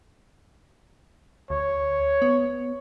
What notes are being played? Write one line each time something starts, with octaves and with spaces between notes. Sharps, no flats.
D2 C#5
B3